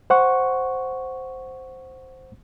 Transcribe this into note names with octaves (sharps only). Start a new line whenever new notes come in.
C5 F#5 C#6